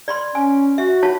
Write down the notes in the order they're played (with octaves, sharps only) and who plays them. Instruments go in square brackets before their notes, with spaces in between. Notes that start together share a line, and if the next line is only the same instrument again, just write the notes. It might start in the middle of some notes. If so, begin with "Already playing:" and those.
[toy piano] D5 B5 C6
[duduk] C#4 [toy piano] G#5
[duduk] F#4 [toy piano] E5
[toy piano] F4 C#5 A5